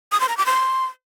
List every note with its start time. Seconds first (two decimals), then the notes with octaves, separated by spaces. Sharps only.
0.12 D#6
0.20 C6
0.29 A#5
0.37 D6
0.46 C6